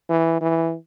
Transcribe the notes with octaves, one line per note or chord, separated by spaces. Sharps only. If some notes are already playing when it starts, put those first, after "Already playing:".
E3
E3